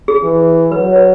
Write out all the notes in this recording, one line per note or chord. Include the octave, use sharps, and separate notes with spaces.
G#4
E3
F#3 B4
C#5
B4